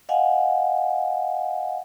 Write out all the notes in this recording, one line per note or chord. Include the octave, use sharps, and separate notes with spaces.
D#5 F5 F#5 G#5